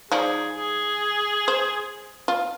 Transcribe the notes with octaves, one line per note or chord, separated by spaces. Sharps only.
F3 D#4 G#4 D5
G#4
C5
F4